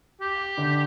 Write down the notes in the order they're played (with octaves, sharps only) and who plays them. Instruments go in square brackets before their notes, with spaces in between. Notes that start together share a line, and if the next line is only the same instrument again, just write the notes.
[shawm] G4
[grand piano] D3